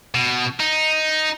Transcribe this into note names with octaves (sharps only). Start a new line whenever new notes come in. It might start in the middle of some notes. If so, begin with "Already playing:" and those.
B2
D#4